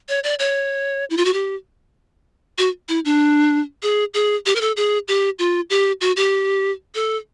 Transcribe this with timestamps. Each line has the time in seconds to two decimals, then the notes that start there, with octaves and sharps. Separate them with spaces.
0.09 C#5
0.24 D5
0.39 C#5
1.10 E4
1.17 F4
1.25 F#4
1.33 G4
2.58 F#4
2.89 E4
3.05 D4
3.83 G#4
4.14 G#4
4.46 G4
4.56 A#4
4.61 A4
4.77 G#4
5.08 G4
5.39 F4
5.70 G4
6.01 F#4
6.17 G4
6.95 A4